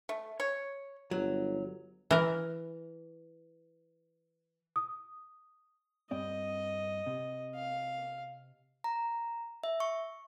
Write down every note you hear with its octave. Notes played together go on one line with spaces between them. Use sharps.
A3
C#5
G1 F#3
E3 A#4
D#6
G2 C4 D5 D#5
C3
F5
A#5
E5
C#6